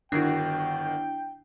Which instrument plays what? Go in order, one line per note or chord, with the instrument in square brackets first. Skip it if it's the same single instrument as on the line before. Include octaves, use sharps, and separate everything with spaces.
[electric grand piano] G1 D#3 F#4 [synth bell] D4 E4 [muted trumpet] G5